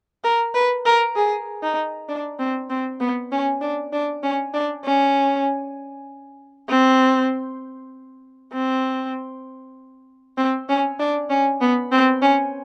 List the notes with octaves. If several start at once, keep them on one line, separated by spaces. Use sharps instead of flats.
A#4
B4
A#4
G#4
D#4
D4
C4
C4
B3
C#4
D4
D4
C#4
D4
C#4
C4
C4
C4
C#4
D4
C#4
B3
C4
C#4